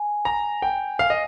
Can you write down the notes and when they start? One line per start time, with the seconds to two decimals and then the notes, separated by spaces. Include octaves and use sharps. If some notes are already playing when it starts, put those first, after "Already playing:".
Already playing: G#5
0.25 A#5
0.62 G5
0.99 F5
1.10 D#5